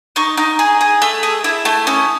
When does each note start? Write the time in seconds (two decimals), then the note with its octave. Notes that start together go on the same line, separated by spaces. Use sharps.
0.16 D#4 C#6
0.37 D#4
0.59 G#4
0.81 G#4
1.02 A3 E6
1.23 G#4
1.44 E4
1.65 A3
1.87 C#4 D#6